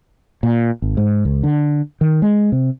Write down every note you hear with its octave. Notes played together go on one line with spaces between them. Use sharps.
A#2
G#1
G#2
C#2
D3
D#3
G#3
C3